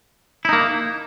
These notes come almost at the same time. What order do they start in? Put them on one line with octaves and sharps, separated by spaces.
E4 D#4 A#3